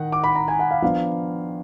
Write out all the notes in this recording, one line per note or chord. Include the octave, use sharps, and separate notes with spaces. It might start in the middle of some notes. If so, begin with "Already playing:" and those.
Already playing: D#3 D#4 F#5
D6
B5
A#5
G#5
F#5
F5
F3 B3 D4 F5